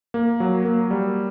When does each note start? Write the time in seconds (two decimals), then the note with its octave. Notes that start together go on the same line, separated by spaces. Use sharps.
0.14 A#3
0.40 F#3
0.65 A#3
0.91 G3